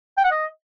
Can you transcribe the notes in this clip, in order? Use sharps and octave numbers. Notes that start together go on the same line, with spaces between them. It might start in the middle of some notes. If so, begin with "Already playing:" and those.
G5
F#5
D#5